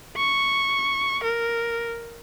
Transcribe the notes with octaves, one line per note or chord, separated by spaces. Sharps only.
C#6
A#4